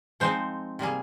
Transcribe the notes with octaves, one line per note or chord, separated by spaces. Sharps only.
F3 G#3 C4 D#4 C5
C3 G3 A#3 G#4